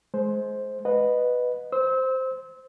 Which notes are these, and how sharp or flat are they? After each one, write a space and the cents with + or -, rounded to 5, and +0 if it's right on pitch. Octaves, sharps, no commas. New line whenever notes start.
G#3 +25 C5 +0
B4 +0 D#5 -15 F#5 -45
C5 -5 E6 -30